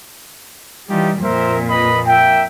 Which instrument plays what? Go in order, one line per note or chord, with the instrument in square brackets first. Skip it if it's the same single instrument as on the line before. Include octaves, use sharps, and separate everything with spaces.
[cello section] E3 G3 [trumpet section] D#4 F4 G4
[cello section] F2 A#2 [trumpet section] A#4 C5 E5
[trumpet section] B4 D#5 B5
[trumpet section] A#3 E5 [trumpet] G5